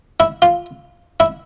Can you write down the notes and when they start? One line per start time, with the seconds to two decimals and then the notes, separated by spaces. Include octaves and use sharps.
0.20 E4
0.42 F4
1.20 E4